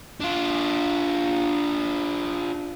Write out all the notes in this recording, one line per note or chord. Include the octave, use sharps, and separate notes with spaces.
D4 F4